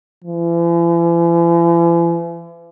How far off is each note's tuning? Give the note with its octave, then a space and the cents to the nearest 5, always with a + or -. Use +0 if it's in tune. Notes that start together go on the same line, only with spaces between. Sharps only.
E3 +45